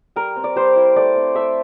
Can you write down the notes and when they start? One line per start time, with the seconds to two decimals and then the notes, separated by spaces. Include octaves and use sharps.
0.16 G3 A#4
0.36 C4
0.44 D5
0.56 G3 C5
0.76 E4
0.96 A3 D5
1.16 C4
1.35 A3 E5